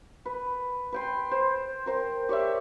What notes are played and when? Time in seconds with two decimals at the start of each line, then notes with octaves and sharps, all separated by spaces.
0.25 B4
0.92 B4 G5 C6
1.31 C5
1.86 A#4 C5 G5
2.29 G4 C#5 D5 E5